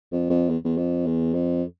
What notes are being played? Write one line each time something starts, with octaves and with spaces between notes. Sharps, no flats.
F2
F2
E2
E2
F2
E2
F2